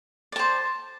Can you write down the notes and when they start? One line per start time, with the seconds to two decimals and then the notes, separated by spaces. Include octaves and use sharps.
0.32 D5
0.36 A5
0.39 C5